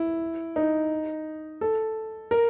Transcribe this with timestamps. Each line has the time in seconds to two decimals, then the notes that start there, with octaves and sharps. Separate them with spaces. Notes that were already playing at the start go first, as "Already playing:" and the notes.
Already playing: E4
0.56 D#4
1.61 A4
2.31 A#4